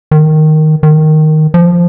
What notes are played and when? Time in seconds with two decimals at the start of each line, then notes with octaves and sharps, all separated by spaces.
0.11 D#3
0.83 D#3
1.54 F3